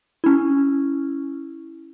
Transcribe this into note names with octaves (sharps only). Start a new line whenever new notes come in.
C#4 E4